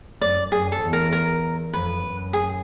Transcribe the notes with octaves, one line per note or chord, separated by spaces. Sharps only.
F#2 D5
F#2 G#4
A4
E2
A#4
A#4
F2 B4
F#2
G#4